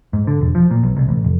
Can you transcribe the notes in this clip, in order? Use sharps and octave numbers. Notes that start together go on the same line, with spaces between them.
G#2
D3
E1
F3
A#2
B1
C2
A1
F1